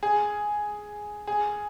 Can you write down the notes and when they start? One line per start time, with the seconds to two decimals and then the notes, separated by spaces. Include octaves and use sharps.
0.03 G#4
1.27 G#4